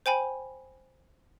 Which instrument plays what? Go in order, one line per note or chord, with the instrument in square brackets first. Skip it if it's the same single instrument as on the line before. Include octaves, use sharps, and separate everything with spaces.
[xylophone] C5 G5 G#5 B5